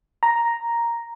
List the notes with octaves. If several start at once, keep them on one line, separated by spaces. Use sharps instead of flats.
A#5